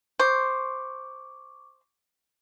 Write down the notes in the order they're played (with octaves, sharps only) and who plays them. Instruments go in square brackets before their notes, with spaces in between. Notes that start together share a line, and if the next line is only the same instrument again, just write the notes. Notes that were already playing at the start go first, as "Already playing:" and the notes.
[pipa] C5 [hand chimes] C#6 D6